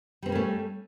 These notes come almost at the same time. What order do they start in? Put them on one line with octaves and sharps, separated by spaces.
G3 C4 A#3 C#4 A3